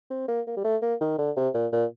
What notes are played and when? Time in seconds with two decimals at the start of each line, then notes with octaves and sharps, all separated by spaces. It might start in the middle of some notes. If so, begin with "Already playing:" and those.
0.10 C4
0.28 A#3
0.47 A#3
0.57 G3
0.64 A3
0.82 A#3
1.01 D#3
1.18 D3
1.36 C3
1.54 A#2
1.73 A#2